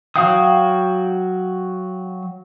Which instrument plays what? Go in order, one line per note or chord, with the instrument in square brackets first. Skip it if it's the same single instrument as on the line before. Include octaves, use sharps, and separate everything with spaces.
[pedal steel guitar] F#3 F#4 F5 G5 D#6